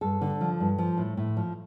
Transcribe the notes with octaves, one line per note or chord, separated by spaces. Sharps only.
G2 A4
D3
F3
G2
F3
A2
A2
F3